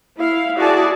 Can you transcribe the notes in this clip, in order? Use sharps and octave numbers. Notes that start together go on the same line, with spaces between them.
E4 F5
E4 F#4 G#4 D5 A5